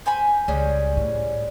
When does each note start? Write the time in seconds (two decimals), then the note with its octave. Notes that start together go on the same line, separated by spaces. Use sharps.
0.06 C5 G#5 B5
0.48 C#2 G3 G#3 C#4
0.97 A2